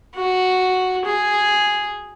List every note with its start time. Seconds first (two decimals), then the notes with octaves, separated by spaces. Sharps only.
0.16 F#4
1.05 G#4